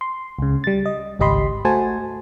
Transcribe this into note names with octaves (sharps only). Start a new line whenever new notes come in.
C6
C#2 C#3
G3 A6
D#5
G#1 C#2 G4 D#5 B5 C6
A3 F#4 C5 G#5 A5